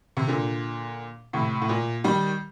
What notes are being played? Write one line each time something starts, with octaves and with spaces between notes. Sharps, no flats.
C3
A#2 D3
A2 C3
A2
A#2
D#3 G3